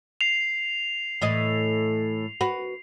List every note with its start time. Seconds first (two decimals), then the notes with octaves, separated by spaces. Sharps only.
0.21 C7 F7
1.21 A2 E3 D#5
2.41 F#4 B4